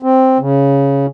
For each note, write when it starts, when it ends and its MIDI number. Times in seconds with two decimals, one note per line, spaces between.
0.03 0.38 60
0.39 1.06 49